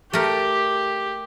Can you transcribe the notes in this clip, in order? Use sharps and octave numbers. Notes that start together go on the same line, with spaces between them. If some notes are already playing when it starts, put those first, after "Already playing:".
A3 G4 A#4